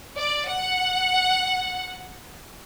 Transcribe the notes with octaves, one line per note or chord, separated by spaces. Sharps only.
D5
F#5